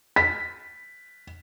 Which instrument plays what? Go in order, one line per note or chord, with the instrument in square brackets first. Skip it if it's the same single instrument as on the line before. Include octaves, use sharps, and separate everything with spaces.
[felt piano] B6